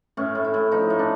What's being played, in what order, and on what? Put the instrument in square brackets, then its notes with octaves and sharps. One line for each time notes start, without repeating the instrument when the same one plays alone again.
[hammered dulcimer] A2 C#4
A2
E4
A2
F3 D#4
A2
D4